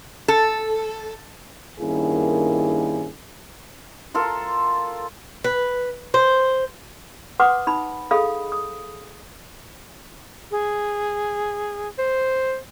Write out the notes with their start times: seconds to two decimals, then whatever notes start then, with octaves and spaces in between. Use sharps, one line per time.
0.28 A4
1.80 G2 D#3 A#3 C#4 E4 G#4
4.14 F4 A4 A#4 C6
5.44 B4
6.14 C5
7.40 B4 F#5 C6 D6 D#6
7.67 D#4 B5
8.11 G#4 A4 D#5 F5 B5 D#6
8.52 D#6
10.51 G#4
11.99 C5